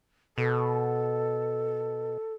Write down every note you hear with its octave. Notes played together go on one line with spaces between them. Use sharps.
B2 A4